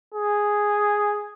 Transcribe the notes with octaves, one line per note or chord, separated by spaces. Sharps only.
G#4